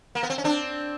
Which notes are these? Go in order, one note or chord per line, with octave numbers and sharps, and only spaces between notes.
A#3
B3
C4
C#4
C4 D4